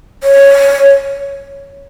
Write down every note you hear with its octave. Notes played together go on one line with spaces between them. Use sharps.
C#5